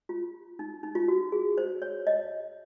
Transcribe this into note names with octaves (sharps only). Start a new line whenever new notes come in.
F4
D#4
D#4
F4
F#4
G#4
C5
C#5
D#5